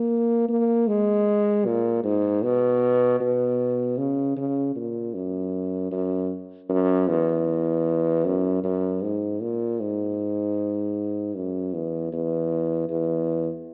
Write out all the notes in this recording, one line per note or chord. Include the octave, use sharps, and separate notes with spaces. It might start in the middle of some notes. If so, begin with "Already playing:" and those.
Already playing: A#3
A#3
G#3
A#2
G#2
B2
B2
C#3
C#3
A#2
F#2
F#2
F#2
E2
F#2
F#2
G#2
A#2
G#2
F#2
E2
E2
E2